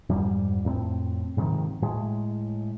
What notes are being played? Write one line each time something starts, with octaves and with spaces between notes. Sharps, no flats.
F2 G#2 G3
F2 A2 A#3 C4
G#2 C3 D#3 F3
A2 G#3